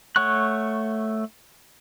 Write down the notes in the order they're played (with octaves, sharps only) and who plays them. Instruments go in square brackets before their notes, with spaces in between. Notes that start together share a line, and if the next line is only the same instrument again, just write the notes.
[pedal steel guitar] A3 C#5 F#5 C#6 F#6